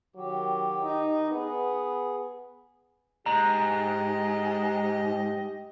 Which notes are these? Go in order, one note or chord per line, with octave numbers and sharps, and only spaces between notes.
D#3 F#3 G4
D#4
B3 G#4
G#2 G4 D#5 A#5